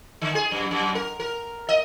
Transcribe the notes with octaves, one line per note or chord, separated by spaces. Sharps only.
D3
G#4
F#2
F#2
A#4
A#4
D#5